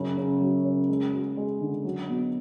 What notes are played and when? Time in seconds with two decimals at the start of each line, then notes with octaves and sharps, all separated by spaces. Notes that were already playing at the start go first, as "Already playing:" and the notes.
Already playing: F#2 C#3
0.17 C#3
0.41 F#3
0.65 C#3
0.89 G#3
1.13 F#4
1.37 G#3
1.61 D3
1.84 F#3
2.09 B2